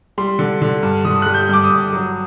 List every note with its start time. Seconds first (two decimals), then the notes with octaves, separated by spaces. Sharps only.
0.18 G3 C6
0.39 D3
0.62 D3
0.83 G2
1.05 D3 D#6
1.22 G3 F#6
1.34 G6
1.49 G2 D6
1.64 D#6
1.70 G2
1.93 F#3